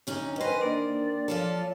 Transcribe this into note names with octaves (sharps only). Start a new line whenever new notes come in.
D2 C#4 D#4
D#3 B4 C5 D#5 G#5
A#3 D4 A#4 D5
F3 F4 A4 C#5